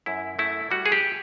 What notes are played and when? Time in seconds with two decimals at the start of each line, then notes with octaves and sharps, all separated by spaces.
0.06 F#2 E4
0.39 A3 E4
0.71 G3 F#4
0.86 G#4
0.92 G4